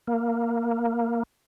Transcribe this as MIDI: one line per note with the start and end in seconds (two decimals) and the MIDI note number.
0.07 1.23 58